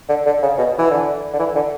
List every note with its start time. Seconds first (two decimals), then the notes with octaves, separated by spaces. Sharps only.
0.09 D3
0.26 D3
0.43 C#3
0.58 B2
0.79 E3
0.91 D3
1.33 D3
1.39 E3
1.55 D3